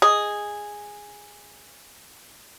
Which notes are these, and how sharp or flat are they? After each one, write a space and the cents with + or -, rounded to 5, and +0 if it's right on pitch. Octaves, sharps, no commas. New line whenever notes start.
G#4 -5 D#5 +0